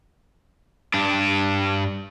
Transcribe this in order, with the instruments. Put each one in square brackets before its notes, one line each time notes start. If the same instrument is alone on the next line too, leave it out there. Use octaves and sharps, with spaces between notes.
[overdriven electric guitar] G2 D4